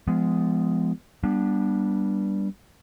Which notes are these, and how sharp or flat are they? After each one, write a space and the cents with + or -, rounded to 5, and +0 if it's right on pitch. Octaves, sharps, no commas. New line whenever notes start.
F3 -25 G#3 +0 B3 +20
G3 +0 B3 -35 D4 +0